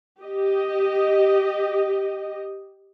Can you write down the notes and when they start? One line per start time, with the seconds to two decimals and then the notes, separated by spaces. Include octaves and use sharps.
0.20 G4 D#5